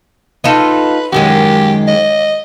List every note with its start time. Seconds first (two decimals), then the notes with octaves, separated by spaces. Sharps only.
0.44 D#4 F4 A4 B4
1.12 F#2 D#3 G#3 G4
1.88 D#5